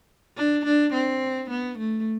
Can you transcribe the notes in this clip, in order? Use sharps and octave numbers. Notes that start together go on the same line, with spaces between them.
D4
D4
C4
B3
A3